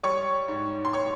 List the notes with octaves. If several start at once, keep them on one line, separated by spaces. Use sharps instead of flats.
G3 C#5 C#6
G#2
C6
C#5 C#6